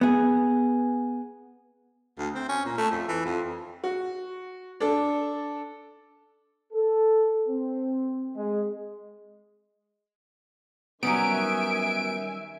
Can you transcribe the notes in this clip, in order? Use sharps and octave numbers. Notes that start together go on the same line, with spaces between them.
B3 G#4
D2
C4
C#4
A#2
A3
F2
E3
F2
F#4
D4 A4
A4
C4
G#3
D#3 F#3 G3 B3 C#4 E5 G#5 D7